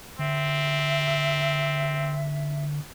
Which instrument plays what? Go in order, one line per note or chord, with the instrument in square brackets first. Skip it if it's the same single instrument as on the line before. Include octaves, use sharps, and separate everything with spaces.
[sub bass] D3 [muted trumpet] C4 [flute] E5